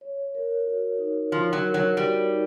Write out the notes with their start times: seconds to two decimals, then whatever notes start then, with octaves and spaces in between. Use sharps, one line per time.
0.01 C#5
0.35 A#4
0.66 F#4
0.99 D#4
1.32 F3 C#5
1.53 F#3
1.64 A#4
1.74 F#3
1.96 G3 F#4
2.29 D#4